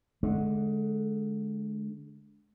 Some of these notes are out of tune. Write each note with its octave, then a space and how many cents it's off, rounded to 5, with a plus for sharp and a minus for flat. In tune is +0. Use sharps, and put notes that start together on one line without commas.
D3 +0 G#3 +25